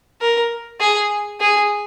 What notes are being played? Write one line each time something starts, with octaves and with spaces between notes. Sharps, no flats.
A#4
G#4
G#4